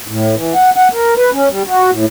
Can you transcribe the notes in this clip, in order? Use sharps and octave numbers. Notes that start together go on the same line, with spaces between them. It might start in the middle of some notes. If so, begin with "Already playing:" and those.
A2
E3
F#5
F#5
A#4
B4
C#4
G3
F#4
A2